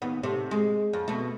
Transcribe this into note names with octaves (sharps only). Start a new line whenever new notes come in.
D#2 B3
C3 A3
G#3
F2
B2 A3